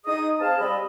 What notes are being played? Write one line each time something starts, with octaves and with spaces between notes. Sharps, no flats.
D#4 G#4 D#5 D#6
C4 G#4 F5 A5
G3 C4 D#5 B5